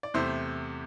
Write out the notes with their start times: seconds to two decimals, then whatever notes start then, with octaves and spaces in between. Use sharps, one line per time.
0.03 D5
0.14 E2 C3 A3 C5 E5